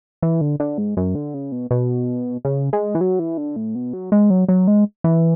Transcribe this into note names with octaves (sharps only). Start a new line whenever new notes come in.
E3
D3
D3
G#2
F#2
D3
C#3
B2
B2
C#3
G#3
E3
F#3
E3
D3
A2
B2
F#3
G#3
F#3
F#3
G#3
E3